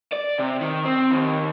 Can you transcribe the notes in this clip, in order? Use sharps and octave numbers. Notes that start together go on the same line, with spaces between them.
D5
C3
D#3
C4
D#2